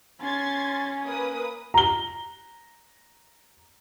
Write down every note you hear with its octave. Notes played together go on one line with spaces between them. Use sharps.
C#4 C6 G#6 A6
A#3 B4 D#6
A#5 G7